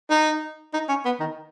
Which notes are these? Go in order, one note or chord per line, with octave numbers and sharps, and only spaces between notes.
D#4
D#4
C#4
B3
D#3